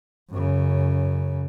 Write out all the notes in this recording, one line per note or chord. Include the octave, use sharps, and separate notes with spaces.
F#2 C#3